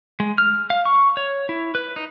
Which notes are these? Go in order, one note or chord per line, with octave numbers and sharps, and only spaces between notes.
G#3
F6
F5
C#6
C#5
E4
B4
D#4